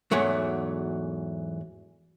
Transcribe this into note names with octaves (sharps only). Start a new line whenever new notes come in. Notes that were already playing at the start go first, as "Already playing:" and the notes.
E2 G#2 F#3 A3